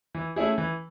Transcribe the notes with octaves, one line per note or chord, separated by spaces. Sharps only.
E3
A3 C#4 E4 G#4
E3